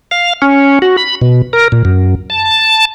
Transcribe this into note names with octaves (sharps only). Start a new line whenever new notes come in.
F5
C#4
F#4
B5
B2
A#4
A#2
F#2
A5